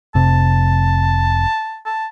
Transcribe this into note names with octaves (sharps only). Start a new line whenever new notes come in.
F1 C3 A5
A5